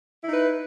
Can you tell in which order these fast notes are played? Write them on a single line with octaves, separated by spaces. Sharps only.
E4 D#4 B4